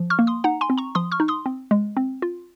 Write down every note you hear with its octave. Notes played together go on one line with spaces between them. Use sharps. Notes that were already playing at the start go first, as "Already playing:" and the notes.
Already playing: F3
C#6 F6
A#3
C6 D#6
D#4 F#5 A#5
G#5 C6
C4
A#5 C#6
F3 C6 D#6
C#6 F6
D#4
C6 D#6
C4
G#3
C4
F4